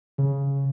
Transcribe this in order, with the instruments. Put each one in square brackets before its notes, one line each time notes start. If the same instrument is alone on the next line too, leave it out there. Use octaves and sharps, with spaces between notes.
[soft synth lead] C#3